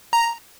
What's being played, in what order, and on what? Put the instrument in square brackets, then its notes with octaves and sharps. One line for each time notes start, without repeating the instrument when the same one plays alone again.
[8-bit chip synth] A#5